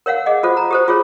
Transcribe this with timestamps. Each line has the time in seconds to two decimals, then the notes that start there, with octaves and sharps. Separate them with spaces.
0.06 A#4 C#5 F5 F#5
0.26 G#4 D#5 F#5
0.43 F4 A4 C5
0.57 A#5
0.71 G4 A4 C5
0.88 F4 G#4 C#5